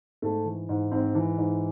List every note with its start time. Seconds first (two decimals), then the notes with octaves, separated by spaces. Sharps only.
0.22 G#2 A3
0.45 E3
0.69 G#2
0.91 G#2 C4
1.15 E3
1.38 G#2